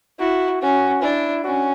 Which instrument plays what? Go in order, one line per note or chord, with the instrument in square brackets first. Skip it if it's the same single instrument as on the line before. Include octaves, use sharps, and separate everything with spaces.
[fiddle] E4 [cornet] F#4
[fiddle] C#4 [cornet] F#4
[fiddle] D4 [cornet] E4
[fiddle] C#4 [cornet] F#4